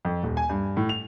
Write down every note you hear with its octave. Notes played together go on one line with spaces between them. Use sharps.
F2
D#1
G#5
G2
A2
F7